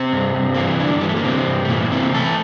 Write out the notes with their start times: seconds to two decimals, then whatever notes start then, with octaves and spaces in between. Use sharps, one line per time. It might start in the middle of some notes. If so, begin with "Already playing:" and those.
Already playing: C3 C4
0.12 G2
0.34 G2
0.55 E3 A#3
0.67 C4
0.79 G2 D3 D4
1.01 E3 G3
1.09 A3
1.16 A#3
1.24 C3 E3 C4
1.47 G2
1.65 A3
1.69 A#2 E3 A#3
1.92 C3 E3 C4
2.14 E3 A3 A4